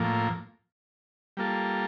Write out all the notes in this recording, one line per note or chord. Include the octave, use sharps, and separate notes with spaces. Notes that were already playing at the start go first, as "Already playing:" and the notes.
Already playing: A2 F3 A#3
G3 A#3 F4 A4